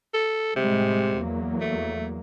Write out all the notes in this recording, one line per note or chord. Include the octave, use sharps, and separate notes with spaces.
A4
A2 C3 G3 G#3
E2 F#3 A#3
A3